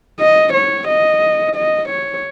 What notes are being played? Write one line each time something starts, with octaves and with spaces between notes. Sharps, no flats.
D#5
C#5
D#5
D#5
C#5